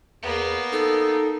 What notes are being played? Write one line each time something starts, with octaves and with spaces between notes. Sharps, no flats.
E2 A#3 B3
D#4 A4